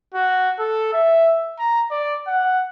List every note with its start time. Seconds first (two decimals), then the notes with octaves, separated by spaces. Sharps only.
0.14 F#4
0.59 A4
0.93 E5
1.59 A#5
1.91 D5
2.27 F#5